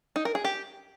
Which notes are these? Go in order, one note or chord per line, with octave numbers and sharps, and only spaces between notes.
D#4
A#4
G#4
G4